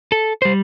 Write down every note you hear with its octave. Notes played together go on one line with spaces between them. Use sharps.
A4
G3 C5